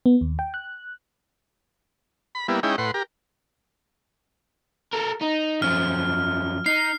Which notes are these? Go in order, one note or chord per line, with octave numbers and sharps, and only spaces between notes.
B3
D#2
G5
F#6
B5
G3 A#3 B3 E4
G#3 C#4 D#4 E4 G5
A2 B4 F#5 C6
G4 A#4
A4 A#4
D#4
F#2 F3 F6
D#4 C7